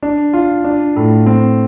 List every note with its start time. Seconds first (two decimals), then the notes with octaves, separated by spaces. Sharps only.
0.03 D4
0.33 F4
0.64 D4
0.96 A2
1.26 C4